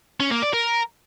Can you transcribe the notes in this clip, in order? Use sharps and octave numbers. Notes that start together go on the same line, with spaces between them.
C#4
A#3
D5
A#4